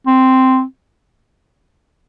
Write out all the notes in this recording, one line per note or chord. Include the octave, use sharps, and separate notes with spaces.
C4